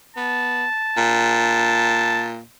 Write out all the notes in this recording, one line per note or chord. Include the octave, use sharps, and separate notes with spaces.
B3 A5
A#2